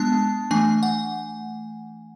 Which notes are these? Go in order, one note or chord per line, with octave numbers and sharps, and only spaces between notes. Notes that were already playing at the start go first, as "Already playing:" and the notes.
Already playing: G#3 B3 D4 A5
E3 A3 D4 G#5
F#5